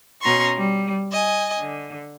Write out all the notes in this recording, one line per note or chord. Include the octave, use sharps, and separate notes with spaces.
B2 C#4 A#5 C6 C#6
G3
D#5 G#5
D3